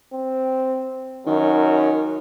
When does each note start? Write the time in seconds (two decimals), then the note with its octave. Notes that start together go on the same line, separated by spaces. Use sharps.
0.13 C4
1.27 F#2 D#3